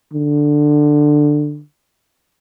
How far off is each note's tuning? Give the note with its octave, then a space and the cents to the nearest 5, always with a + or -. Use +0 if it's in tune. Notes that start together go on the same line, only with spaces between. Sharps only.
D3 +10